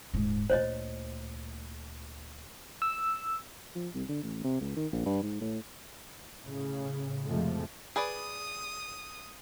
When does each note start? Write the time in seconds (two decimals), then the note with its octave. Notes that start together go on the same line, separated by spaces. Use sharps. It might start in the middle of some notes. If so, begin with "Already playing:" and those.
0.14 D#1 G#2
0.50 D2 A#2 C5 C#5 D#5
2.82 E6
3.75 F3
3.94 C2
4.09 D3
4.23 A1
4.44 C3
4.61 C#2
4.77 D#3
4.93 A#1
5.06 G2
5.23 G#2
5.41 A2
6.43 A2 C#3
7.25 F2 C3 F3 G#3 A3
7.96 G#4 B4 D5 D#6